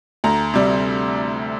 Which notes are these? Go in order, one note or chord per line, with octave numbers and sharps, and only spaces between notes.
D2 A#5
C3 G3